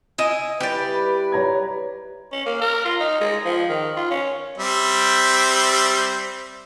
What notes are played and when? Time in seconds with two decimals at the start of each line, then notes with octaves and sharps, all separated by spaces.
0.18 E4 D#5 G#5
0.60 G3 E4 G4 B4 D5
1.32 C#5 A#5 G#6
2.32 C#4
2.46 A#3
2.61 A#4
2.85 F4
3.00 D#4
3.21 G#3
3.45 F3
3.69 D#3
3.96 F4
4.10 C#4
4.58 G3 C4 E5